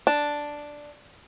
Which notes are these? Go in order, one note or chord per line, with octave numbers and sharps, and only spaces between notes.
D4